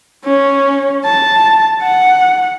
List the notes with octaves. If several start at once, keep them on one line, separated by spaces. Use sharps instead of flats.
C#4
A5
F#5